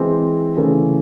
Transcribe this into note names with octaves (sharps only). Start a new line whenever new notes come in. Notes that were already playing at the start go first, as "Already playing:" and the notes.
Already playing: E3 G#3 C4
C#3 E3 A3